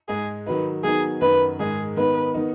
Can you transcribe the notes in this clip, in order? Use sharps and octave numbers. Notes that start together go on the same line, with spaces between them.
G#2 G#3 D#4 G#4
D#3 F#3 D#4 B4
D#3 F#3 B3 D#4 G#4
F#2 D#3 F#3 D#4 B4
G#2 D#3 G#3 D#4 G#4
D#3 B3 D#4 B4
D#3 B3 D#4